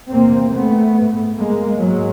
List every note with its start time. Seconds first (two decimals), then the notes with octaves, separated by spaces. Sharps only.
0.11 E2 C3 A#3 C4
0.53 A3 B3
0.95 G#2
1.37 G#3 A#3
1.79 G#2 F#3 G#3